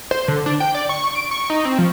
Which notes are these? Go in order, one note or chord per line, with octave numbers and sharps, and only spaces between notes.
C5
D3
D4
G5
D5
C#6
D7
C#6
D#4
C4
F3